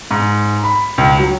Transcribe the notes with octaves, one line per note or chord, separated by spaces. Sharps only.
G#2
B5
C#2
F#3